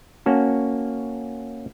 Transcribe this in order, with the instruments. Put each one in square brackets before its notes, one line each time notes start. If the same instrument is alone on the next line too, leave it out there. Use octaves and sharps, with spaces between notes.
[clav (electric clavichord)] A#3 C#4 F#4 A5